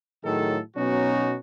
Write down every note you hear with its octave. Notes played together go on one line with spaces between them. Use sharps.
A2 D#3 F#3 G#4 A4
B2 F#3 B3 C#4 D#4 F#4